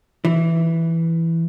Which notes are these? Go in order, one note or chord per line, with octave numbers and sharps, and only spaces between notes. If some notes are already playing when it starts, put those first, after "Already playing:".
E3